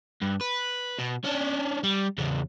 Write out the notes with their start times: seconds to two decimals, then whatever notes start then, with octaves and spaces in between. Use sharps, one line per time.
0.22 G2
0.41 B4
0.98 B2
1.24 C#4 D4
1.83 G3
2.18 E2 C#3